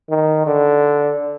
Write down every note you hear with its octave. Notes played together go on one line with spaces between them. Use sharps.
D#3
D3